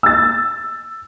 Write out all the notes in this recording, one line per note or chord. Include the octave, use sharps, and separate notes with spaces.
E6 A6